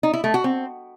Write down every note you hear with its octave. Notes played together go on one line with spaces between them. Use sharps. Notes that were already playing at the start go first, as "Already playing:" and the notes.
D#4
E4
A3
F#4
C4